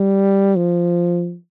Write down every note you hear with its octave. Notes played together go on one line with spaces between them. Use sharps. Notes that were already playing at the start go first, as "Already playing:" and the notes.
Already playing: G3
F3